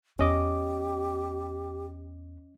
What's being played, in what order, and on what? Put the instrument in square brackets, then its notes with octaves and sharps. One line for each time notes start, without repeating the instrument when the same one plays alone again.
[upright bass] E2 B3 [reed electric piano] C#4 D#5 D6 [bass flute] G4